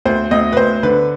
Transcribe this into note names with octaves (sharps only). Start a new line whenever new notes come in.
D2 C5
D2 D#5
B4
D2 C5
D3 B4